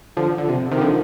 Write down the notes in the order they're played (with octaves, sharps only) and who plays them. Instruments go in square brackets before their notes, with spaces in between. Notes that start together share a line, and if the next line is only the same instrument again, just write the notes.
[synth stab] D3 F3
D3
C3
C3 D#3
G3
D3 F3